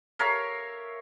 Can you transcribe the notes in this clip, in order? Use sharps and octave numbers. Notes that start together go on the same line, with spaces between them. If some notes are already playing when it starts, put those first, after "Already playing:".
A#4 C#5 E5 F5